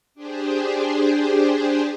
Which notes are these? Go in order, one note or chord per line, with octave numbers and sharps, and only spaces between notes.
D4 G4 G#4 C5